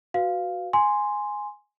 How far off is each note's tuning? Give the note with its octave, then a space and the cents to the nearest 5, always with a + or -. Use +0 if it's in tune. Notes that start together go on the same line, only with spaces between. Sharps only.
F#4 +0 B4 +0 F5 +0
G#5 +0 C6 +0